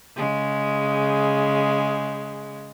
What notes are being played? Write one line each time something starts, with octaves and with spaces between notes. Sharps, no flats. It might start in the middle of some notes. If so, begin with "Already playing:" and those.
C#3 G#3